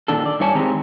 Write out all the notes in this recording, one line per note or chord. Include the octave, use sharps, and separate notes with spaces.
A#2 D3 D#3 D4 A4
D5
G2 E4 C#5 G#5 A5
D#3 G#3 C4 G4 A#5